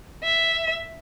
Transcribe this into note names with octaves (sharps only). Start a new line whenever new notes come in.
E5